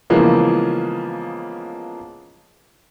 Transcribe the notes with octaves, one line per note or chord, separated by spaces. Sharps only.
C#3 E3 F3 G#3 A#3 B3